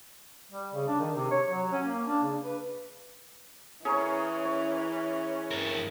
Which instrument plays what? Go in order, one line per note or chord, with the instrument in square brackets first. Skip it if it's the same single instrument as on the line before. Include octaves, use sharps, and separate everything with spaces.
[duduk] G3
C#3
D4
D#3
C3
C#5
F#3
C#4
A#3
D4
C#3
B4
[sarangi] E3 [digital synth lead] C#4 [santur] G#4 A#4 C#5
[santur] C#5
[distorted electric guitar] G2 A#4